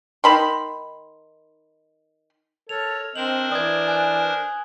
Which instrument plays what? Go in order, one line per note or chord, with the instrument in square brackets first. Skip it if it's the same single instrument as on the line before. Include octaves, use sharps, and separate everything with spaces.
[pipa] D#3 B5 C6
[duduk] A4 [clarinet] A#4 [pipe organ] C#5 [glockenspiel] F7
[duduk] C4 [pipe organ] D4 A#4 C5 [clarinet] D#5 [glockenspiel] F#7
[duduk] E3 [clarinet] D5 [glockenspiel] D#6 G#6
[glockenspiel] G#5 F#6